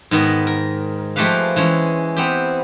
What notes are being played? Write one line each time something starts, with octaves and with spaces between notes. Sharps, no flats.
G#2 D#3 B3 A#4
A#4
F3 G#3 A3 G4 B4 F5
E3 G#3 C#4
B3 C4 G4